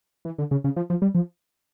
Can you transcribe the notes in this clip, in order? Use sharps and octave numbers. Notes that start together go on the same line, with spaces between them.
E3
D3
C#3
C#3
F3
F3
G3
F3